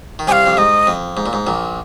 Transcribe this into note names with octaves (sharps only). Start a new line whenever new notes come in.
D#3
C2 C3 F5 G#5
F2
G#2 D#5
F2
G#2
A#2
G#2
A#1 A#2